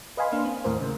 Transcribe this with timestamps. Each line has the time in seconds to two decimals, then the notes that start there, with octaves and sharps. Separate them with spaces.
0.17 B4 D#5 F5 G#5 B5 C6
0.32 A#3 D4 F5
0.45 C4
0.64 D#2 A2 A#4 C5
0.80 C#3